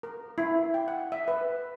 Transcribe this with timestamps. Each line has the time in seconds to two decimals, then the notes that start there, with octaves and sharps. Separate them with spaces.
0.03 A#4
0.38 E4
0.74 G5
0.88 F#5
1.12 E5
1.28 B4